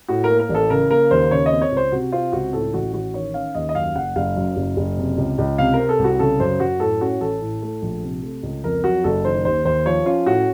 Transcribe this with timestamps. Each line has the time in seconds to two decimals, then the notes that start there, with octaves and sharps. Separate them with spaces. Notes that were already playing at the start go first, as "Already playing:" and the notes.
0.08 A2 F#4
0.24 A#4
0.30 A#3
0.39 A#4
0.49 A1
0.54 A4
0.70 C#3 A#4
0.90 A#3 A#4
1.11 D#2 C5
1.31 C#3 C#5
1.46 D#5
1.52 C4
1.61 C#5
1.72 C#2
1.77 C5
1.92 C3 F#4
2.12 C4 F4
2.32 C#2 F#4
2.53 A2 A4
2.74 A1 F#4
2.93 A1 F#4
3.14 D#3 C#5
3.34 C#4 F5
3.55 D#2 D#5
3.69 D#5
3.75 F#2 F5
3.95 F#1 F#5
4.16 F#1 F5
4.36 F#2
4.56 F#1
4.77 F#1
4.97 C3
5.18 C#2
5.38 C#2
5.58 C3 F5
5.73 A#4
5.79 C4
5.89 A4
5.99 C2
6.04 F#4
6.19 C#3 A4
6.39 F#2 C5
6.60 F#2 F#4
6.80 A2 A4
7.01 C#4 F#4
7.21 A1 A4
7.42 A2
7.62 A3
7.82 A#1
8.02 C3
8.23 A3
8.43 C#2
8.64 F2 A#4
8.84 F#3 F#4
9.04 F#1 A4
9.25 D#3 C5
9.45 D#2 C5
9.65 D#2 C5
9.86 F3 C#5
10.06 C#4 F4
10.26 A2 F#4